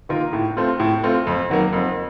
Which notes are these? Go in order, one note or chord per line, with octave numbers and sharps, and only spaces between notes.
D#3 A#3 F4 A#4
A2
A3 C4 F4
A2
A3 C4 F4
F2
D#3 F#3 A#3
F2